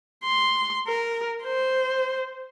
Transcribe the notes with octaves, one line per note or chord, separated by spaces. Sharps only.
C6
A#4
C5